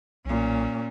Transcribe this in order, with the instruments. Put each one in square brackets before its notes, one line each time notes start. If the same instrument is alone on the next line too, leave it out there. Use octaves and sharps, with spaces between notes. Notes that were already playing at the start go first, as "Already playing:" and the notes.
[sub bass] B1 [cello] A#2 C#4